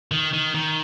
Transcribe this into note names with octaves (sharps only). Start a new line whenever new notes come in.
D#3
D#3
D#3